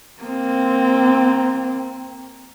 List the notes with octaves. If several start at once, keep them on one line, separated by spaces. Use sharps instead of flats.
A#3 C4